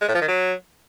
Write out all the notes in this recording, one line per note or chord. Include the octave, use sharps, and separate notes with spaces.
G#3
A2
F3
D#3
F#3